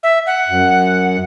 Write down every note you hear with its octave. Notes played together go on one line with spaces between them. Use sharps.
E5
F#5
F#2